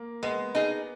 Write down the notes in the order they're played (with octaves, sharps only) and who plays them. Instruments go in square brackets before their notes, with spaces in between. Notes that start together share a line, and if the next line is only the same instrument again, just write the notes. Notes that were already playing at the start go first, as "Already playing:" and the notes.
Already playing: [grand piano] A#3
[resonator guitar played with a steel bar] G#3 [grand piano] B3
[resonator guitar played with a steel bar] D#4 G#4